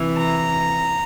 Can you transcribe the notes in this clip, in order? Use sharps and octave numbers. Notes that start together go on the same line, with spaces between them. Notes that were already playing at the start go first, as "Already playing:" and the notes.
Already playing: C3 E3
A#5